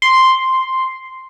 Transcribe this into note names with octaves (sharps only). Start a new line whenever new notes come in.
C6